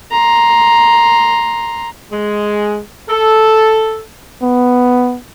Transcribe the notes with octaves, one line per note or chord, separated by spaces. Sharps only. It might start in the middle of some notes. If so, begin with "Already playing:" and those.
A#5 C6
G#3
A4
B3